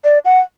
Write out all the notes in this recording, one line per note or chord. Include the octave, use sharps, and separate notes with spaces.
D5
F#5